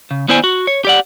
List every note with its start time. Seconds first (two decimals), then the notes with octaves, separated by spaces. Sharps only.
0.11 C#3
0.28 D#2 B3 E4 C5 D5 G#5
0.44 F#4
0.67 C#5
0.85 G4 D5 F#5